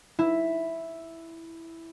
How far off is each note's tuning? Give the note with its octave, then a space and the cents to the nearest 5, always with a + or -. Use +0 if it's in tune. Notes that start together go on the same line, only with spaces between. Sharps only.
E4 +0